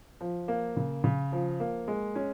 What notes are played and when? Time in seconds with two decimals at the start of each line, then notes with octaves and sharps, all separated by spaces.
0.21 F3
0.48 A#3
0.77 C#3
1.04 C#3
1.32 F3
1.60 A#3
1.88 G#3
2.15 C#4